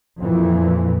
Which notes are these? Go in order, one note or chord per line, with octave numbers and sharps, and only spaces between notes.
F2 A#2 E3